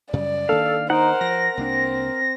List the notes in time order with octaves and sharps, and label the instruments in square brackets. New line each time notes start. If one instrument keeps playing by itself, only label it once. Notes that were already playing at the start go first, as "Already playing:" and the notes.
[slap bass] F#2 C#3 G3 [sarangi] D5
[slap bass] D#3 A#3 D4 [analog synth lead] A4 [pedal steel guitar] F5
[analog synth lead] D#4 [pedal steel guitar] A#4 F#5 [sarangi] C5
[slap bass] F3 [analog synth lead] A#6
[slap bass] C2 A#3 D4 [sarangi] C4